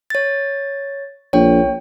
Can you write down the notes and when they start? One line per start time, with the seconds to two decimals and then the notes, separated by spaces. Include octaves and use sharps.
0.10 C#5 A6
1.33 A#1 C#5 G5